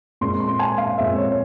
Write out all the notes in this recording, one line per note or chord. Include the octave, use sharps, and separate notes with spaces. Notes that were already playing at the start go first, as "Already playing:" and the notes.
A#2 G#3 C4 C6
C6
G#5
F5
A#2 G#3 C4 E5
C#5